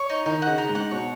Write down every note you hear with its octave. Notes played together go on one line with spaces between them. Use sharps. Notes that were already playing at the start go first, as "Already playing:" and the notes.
Already playing: C#5
D#4
D#3 D#4
F#5
C#3
D#4
G#2
F#5
B2 C#5